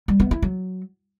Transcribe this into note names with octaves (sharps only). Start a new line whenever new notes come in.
G3
B3
E4
F#3